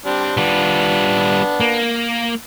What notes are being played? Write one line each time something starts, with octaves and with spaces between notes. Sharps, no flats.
G3 C4 D4
G3 B3 D4 F4
A#3